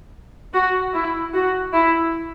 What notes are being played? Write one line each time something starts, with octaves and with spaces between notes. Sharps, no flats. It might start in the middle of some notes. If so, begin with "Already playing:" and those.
F#4
E4
F#4
E4